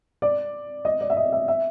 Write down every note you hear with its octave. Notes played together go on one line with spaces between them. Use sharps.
D5
D#5
D5
E5
D#5
E5
E5